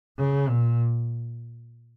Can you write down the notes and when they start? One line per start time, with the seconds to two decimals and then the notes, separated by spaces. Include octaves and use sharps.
0.18 C#3
0.49 A#2